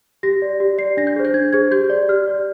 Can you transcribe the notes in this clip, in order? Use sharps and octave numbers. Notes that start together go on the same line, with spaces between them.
G4 A#6
D5
G4
D5 C7
D4 A#6
G6
G#4 C5
G6
D4 G#6
G#4 C5 G#6
G4 G6
D5
G4 F6
D5